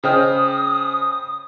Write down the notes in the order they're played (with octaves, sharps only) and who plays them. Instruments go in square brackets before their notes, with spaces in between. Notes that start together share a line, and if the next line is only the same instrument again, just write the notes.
[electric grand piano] C#3 F6 [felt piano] C5 D#5 G5 [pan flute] D#6